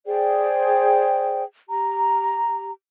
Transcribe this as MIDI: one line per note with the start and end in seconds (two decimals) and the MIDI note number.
0.06 1.42 68
0.06 1.42 72
0.06 1.42 74
0.06 1.42 79
1.68 2.71 67
1.68 2.71 82